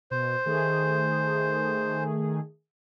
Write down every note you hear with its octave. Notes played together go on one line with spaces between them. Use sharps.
B2 C5
D#3 A3 G#4